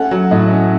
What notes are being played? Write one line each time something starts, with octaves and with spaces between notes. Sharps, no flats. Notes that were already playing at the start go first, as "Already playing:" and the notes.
Already playing: A3 C#4 F#5
F#3
A2 D#5
C#4